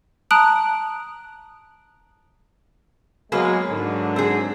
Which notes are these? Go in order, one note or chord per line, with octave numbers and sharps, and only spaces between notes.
A5 A#5 D#6 F#6 D7 F#7
F#3 G#3 A#3 B3 G#4 B4
G#2 D3 F#3
C4 G#4